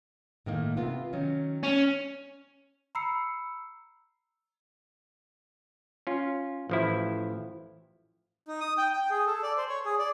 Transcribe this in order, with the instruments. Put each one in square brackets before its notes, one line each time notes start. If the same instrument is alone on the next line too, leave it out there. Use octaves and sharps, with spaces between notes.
[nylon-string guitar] A2 D#3 A#3
C3 B3 F4
D#3 F#3 C#4
[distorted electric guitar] C#4
[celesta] A#5 B5 E6 C7 C#7
[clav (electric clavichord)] C#4 F4
A1 F3 E4
[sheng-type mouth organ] D#4
D#6
G5
G5
G#4
A4
D5
C5
C#5
G#4
D5